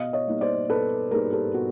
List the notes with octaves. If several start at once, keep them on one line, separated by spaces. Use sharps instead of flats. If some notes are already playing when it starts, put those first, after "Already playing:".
Already playing: B2 D#5 F5
C#5 D#5
G3 A#3 D#4
C5 D5
B2 A4 B4
G3 A#3 D#4 G#4 A#4
G4 A4
B2 F#4